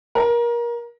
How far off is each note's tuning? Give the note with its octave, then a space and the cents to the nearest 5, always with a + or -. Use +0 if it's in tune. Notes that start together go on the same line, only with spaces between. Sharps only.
A#4 +25